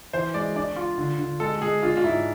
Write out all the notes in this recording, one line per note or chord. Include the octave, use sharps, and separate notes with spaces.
E3 C5
G#3 D5
D4 D5
F4
D3
D3
G#3 A4
G#3 G#4
D4 F4
F4
G#2 E4